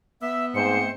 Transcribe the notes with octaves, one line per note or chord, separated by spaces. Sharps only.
B3 E5
G#2 A3 C4 C5 C#7